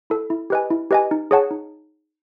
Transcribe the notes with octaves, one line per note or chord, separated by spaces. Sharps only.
E4 A4
E4
G4 B4 D#5 G#5
E4
G4 B4 D#5 G#5
D#4
G#4 C#5 F#5 A5
D#4